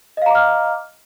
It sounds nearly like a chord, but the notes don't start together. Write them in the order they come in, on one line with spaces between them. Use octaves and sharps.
D#5 F5 A#5 D6 F6